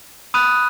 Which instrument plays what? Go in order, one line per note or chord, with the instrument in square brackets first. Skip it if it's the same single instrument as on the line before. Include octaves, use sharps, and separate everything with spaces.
[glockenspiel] B5 D#6 F#6 D#7